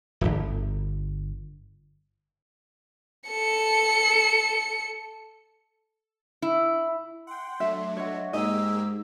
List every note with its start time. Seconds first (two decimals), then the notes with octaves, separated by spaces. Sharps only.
0.21 D1 G1
3.29 A4 C#7
6.42 E4
7.27 F#5 G5 C6
7.60 F#3 A3 D4 E5
7.97 F#4 C#5 D#5 E5
8.33 G#2 A#3 G4 G#4 D#5 E6